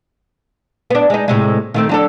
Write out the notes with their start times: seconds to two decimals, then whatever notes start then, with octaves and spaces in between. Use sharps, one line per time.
0.90 B3 D4
1.10 G#3 D#4
1.28 A2 C3 G#3
1.74 D#3 A3 C4
1.89 F#3 D4 A4